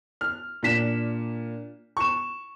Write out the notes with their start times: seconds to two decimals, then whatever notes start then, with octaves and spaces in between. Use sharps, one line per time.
0.21 F6
0.63 A#2 D4 B6 E7
1.97 C#6 E7